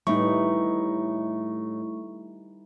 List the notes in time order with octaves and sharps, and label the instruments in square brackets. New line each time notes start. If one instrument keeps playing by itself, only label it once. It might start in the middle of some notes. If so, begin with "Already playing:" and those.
[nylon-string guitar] A2 [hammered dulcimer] E3 [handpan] G3 D#4 [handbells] A3 C#6